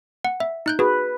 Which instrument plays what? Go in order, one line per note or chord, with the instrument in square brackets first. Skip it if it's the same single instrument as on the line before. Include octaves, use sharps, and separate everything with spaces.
[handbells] F#5
E5
D#4 F#6 G6
[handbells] F#4 G#4 [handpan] B4